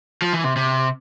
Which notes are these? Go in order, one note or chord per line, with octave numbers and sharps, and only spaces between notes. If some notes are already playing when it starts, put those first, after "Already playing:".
F3
E3
C3
C3